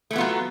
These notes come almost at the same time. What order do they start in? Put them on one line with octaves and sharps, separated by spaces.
A3 E3 B3 F4 F#3